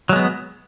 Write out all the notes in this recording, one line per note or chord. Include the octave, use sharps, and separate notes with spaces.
F#3 G#3 B3